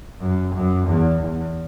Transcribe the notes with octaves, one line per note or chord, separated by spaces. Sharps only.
F#2
F#2
E2
E2